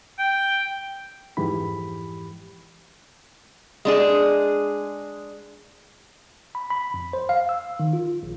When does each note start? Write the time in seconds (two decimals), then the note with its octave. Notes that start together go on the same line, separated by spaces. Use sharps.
0.19 G5
1.37 F2 G#2 E3 G4 B5
3.85 G#3 D4 G#4
6.55 B5
6.70 B5
6.94 F2
7.13 C5
7.29 F5
7.49 E6
7.80 D#3
7.93 F4
8.23 A#1